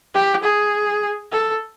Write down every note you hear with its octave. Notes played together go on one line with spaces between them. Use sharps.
G4
G#4
A4